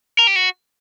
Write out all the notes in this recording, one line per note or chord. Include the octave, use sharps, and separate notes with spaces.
A#4
G4
F#4